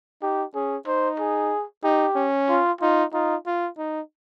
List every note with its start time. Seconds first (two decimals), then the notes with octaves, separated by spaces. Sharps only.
0.22 D#4 G4
0.55 C#4 G#4
0.87 D#4 C5
1.19 G#4
1.84 D#4 G4
2.16 C#4
2.49 F4
2.81 D#4 F4
3.13 D#4 F4
3.46 F4
3.78 D#4